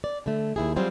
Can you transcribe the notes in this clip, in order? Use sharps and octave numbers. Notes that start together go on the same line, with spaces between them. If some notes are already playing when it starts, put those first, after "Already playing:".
D5
D3 A3
D#2 E4 G#4
F#3 G3 C4 F4 G#4